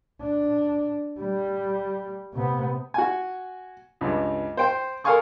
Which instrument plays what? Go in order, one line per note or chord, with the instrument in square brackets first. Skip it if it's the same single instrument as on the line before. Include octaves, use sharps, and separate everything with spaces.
[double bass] D4
G3
C3 B3
[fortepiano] F#4 G#5
C#2 G2
C5 G5 C6
A4 A#4 F5 G#5 C#6 D#6